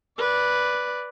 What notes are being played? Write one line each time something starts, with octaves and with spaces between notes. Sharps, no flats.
B4 D5